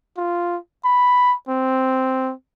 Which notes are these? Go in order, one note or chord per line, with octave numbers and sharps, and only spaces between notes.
F4
B5
C4